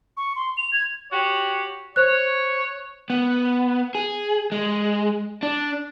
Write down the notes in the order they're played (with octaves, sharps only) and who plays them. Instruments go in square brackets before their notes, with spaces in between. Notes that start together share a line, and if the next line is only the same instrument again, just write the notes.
[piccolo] C#6
C6
F7
G#6
[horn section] F#4 G4 C#5
[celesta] C5 F#6 [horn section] C#5
[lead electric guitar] B3
G#4
G#3
D4